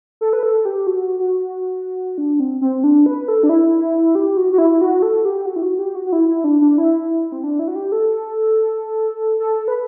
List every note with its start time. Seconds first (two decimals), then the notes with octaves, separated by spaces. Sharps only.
0.21 A4
0.33 B4
0.43 A4
0.65 G4
0.87 F#4
1.19 F#4
2.18 D4
2.40 C4
2.61 C4
2.84 D4
3.06 B4
3.28 A4
3.43 D4
3.49 E4
4.15 G4
4.37 F#4
4.52 F#4
4.58 E4
4.81 F#4
5.02 A4
5.25 G4
5.46 F#4
5.56 E4
5.62 F#4
5.79 G4
5.95 F#4
6.06 F#4
6.13 E4
6.28 E4
6.44 D4
6.61 D4
6.78 E4
7.32 C4
7.44 D4
7.59 E4
7.68 F#4
7.75 G4
7.92 A4
9.40 A4
9.68 B4